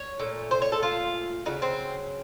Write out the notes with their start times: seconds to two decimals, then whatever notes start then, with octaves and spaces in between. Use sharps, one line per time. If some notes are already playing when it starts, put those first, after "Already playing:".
Already playing: C#5
0.19 A#2 A3
0.51 C5
0.62 C#5
0.72 A4
0.83 F4
1.46 C#3 F#3 A3 D#4
1.62 C4